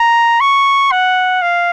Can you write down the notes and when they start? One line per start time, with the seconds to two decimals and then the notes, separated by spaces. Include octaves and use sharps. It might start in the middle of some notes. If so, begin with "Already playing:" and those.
Already playing: A#5
0.40 C#6
0.92 F#5
1.42 F5